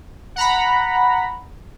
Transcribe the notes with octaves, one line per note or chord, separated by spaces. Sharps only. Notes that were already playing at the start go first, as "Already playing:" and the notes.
F#5 A#5 B5